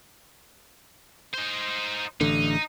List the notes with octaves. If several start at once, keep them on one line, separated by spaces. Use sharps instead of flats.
D#4 C5
A1 D3 D#4